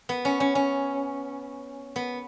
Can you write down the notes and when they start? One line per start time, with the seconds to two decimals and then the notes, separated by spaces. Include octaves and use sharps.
0.09 B3
0.25 C#4
0.40 C#4
0.55 C#4
1.96 B3